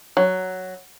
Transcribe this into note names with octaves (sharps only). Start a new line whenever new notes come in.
F#3